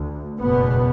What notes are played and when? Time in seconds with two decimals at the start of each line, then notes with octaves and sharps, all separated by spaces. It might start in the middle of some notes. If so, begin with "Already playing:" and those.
Already playing: D2
0.40 F#1 E2 B2 B3